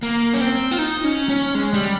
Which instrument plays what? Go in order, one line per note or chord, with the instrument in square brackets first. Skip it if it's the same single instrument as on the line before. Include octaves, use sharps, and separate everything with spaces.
[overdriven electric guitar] A#3
C#4
C4
F4
D#4
C#4
C#4
G#3
G3